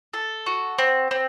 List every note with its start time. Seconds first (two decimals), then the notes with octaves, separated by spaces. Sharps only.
0.14 A4
0.46 F#4
0.79 C4
1.11 C4